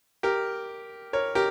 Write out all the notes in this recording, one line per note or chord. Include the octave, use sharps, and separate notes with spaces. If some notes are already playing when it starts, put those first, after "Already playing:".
G4 A#4
A#4 C#5
G4 A#4